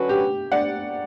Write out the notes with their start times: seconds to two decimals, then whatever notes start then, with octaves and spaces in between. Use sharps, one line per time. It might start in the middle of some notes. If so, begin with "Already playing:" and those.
Already playing: D3 F#3 C#4 F#4 B4
0.09 G4
0.52 D5 F#5